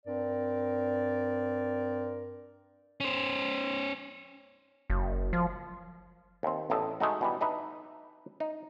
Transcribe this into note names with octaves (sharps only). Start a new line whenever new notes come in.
G2 C4 A#4 D5
C#4 C5
F#1
F3
D#2 C4
A1 E2 A2 A4 D#5 A5
G#3 A3 D#4 F#4
B2 E3 G3
D4 D#4 B4 E5
D#4